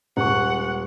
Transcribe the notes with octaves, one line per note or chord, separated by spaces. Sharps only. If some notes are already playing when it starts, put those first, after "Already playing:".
D#1 G#3 F#5 C#6